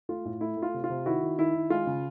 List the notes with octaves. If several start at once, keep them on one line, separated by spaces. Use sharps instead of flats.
A3 F4
A2
A3 E4
A3
F4
C3
F4
C3
D#3 E4 F#4
D#3
D#3 E4
D#3
G#3 F4
C#3